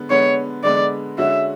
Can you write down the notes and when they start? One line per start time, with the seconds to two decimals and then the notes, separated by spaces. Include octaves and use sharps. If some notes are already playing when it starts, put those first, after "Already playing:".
Already playing: D3 G#3 B3
0.10 D3 G#3 B3 C#5
0.64 D3 G#3 B3 D5
1.18 D3 G#3 C#4 F#4 E5